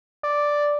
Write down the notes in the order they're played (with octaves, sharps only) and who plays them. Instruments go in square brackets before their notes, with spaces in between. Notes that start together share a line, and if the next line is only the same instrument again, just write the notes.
[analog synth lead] D5